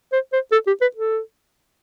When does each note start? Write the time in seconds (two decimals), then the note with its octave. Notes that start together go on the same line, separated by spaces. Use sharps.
0.13 C5
0.33 C5
0.52 A4
0.67 G4
0.81 B4
0.96 A4